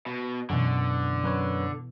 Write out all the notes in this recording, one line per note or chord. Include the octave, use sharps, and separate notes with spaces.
B2
F#2 B2 D3 E3 C#6
F#2 B4 C#5